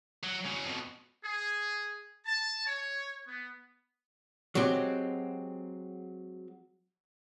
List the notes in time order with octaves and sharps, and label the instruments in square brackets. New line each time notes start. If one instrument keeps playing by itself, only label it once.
[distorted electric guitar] F#3
C#3 F#3
F2 B2
[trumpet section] G#4
A5
C#5
B3
[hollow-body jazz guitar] F#3 G#3 C4 G4